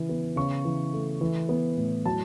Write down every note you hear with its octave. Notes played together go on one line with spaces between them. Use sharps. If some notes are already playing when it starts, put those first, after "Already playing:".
Already playing: C#3 E3
B3
C#3 C#6
E3
A3
E3
B3
A2
F#3 A5